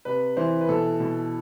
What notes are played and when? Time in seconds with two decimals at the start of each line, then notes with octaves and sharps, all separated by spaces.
0.05 C3 B4
0.37 E3 C5
0.61 B4
0.68 B2 A4
1.00 B2